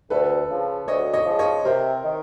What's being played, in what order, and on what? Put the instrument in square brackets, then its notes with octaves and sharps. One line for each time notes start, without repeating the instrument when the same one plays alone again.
[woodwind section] D2 [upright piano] A4 B4
[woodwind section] C#3 F3
[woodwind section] D2 [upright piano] C#5 D#5
[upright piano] C#5 D#5
[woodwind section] C#3 F3
[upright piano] C#5 D#5
[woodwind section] C3 [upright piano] A#4 C5
[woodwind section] D#3